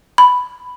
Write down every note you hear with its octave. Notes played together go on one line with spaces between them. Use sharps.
B5